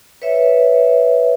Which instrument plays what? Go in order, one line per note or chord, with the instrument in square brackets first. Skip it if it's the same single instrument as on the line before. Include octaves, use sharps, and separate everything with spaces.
[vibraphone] B4 C#5 E5